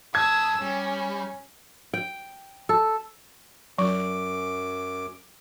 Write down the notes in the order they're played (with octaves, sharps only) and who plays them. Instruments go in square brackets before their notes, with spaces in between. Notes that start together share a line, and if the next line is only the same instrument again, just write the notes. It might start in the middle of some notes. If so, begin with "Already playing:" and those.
[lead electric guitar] F#2 A5 [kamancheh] D#6 E6 [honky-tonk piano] G#6
[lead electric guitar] G3 [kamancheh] C#4
[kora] G5
A4
[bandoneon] F#2 D6 [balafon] F#3